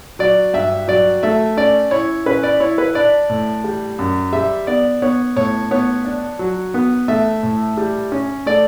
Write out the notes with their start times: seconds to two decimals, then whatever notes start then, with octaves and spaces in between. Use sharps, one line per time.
0.19 F#3 D5
0.54 G2 E5
0.88 F#3 D5
1.23 A3 E5
1.57 C#4 D5
1.91 E4 C#5
2.26 C#4 B4
2.43 D5
2.60 E4 C#5
2.78 B4
2.95 D4 D5
3.29 A2
3.64 G3
3.99 F#2
4.33 G3 E5
4.67 B3 D5
5.02 B3 C#5
5.36 A2 C#5
5.71 B3 C#5
6.05 D4
6.39 F#3
6.74 B3
7.08 A3 E5
7.43 A2
7.77 G3
8.12 C#4
8.46 A3 D5